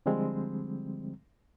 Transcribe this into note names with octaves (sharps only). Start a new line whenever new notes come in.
D3 F3 G3 G#3 C4